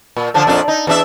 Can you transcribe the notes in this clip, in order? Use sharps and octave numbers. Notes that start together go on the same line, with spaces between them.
A#2
D3 F3 D4
F2 A#2 D4
D#4
E2 D4 E5